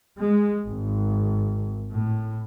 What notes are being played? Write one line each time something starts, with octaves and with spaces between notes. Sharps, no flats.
G#3
G#1
A2